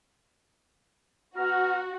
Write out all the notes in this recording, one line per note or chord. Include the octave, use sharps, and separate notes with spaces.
B2 F#4 A#5 F6